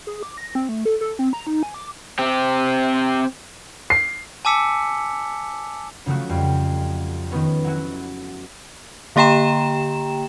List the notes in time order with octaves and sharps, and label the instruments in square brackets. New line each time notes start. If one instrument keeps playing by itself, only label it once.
[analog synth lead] G#4
D6
A#6
C4
A3
A4
A4
C4
A#5
D#4
G#5
D6
[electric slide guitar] C4 G4
[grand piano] C7
[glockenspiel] G#5 A5 D6 E6 B6 C#7
[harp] C#3 F3 F#3 A3 F#4
F2 G3
D#3 B3 C#4
F#3 E4 F#4
[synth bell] D3 A#3 G4 G5 A#5 E7